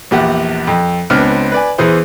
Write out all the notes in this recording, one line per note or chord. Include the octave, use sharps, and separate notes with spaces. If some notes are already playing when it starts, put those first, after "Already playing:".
A#1 E2 G4 E5 F#5
F2
C#2 B3 C4 D4 F6
B4 D5 G#5
E2 E3 G#4 C5